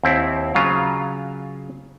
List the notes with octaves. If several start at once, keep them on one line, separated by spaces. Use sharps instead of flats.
D#2 C4 E4
C#3 F#3 F4 F5